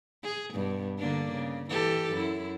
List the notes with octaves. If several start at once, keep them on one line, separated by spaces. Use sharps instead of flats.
G#4
G2 B2
D3 A#3 D4
C#3
E3 G4 A4
F#2 E4